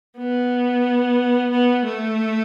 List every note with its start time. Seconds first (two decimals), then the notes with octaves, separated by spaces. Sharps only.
0.18 B3
1.51 B3
1.85 A3